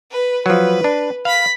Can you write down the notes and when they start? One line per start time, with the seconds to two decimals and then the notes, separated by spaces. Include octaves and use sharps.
0.11 B4
0.46 F3 F#3 B4
0.84 D4
1.25 F5 B5 B6